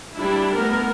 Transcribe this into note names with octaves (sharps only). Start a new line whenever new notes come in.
G3 D4 E4
A3 B3 A#4